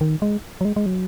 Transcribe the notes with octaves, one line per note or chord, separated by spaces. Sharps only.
D#3
G#3
F#3
G#3
G#3
F#3